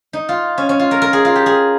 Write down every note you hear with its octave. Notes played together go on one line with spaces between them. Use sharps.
D#4
F4
C#4
C#4
F4
A#4
A#4
G#4
F4
G4
G#4